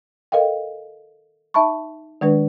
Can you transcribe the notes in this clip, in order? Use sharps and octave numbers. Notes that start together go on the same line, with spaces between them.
A4 A#4 D#5 F5 G5
D#4 E5 A5 B5 C#6
D#3 G#3 D4 B4